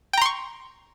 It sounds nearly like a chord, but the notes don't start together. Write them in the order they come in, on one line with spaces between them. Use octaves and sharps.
G5 A#5 C6 C#6